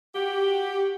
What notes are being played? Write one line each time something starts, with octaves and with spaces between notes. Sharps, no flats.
F#4 G4